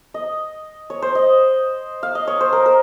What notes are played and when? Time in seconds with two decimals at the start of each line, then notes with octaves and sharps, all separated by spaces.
0.14 D#5
0.90 C#5
1.02 C5
1.15 D#5
2.03 F5
2.15 D#5
2.27 C#5
2.41 C5
2.53 A#4
2.66 A#4